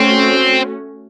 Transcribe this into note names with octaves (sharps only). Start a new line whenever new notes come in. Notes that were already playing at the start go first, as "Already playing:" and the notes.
Already playing: A3 C4 C#4 F#4